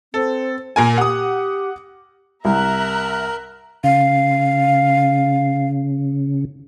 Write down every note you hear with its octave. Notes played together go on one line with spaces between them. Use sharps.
C4 A4
A#2 A#3 A#4 G#5
G4 F#5 D#6
C2 A#4 E5 A#5 F#6
C#3 F5